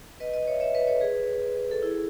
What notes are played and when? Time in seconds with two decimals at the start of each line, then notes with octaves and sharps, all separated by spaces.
0.20 B4 D#5
0.33 B4 D#5
0.47 C#5 E5
0.60 C#5 E5
0.74 B4 D#5
0.87 A4 C#5
1.01 G#4 B4
1.71 A4
1.83 E4 G#4